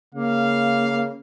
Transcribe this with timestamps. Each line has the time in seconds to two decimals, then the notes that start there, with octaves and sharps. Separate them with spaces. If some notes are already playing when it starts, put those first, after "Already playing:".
0.15 C#3 A#3 F5